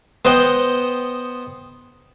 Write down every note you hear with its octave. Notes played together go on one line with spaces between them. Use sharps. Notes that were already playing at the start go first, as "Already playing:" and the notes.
B3 C5 D#5 F#5 G5